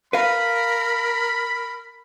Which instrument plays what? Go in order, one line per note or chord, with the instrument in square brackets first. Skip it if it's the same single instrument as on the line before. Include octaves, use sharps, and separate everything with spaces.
[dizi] A#4 [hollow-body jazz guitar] B4 F5 [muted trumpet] B5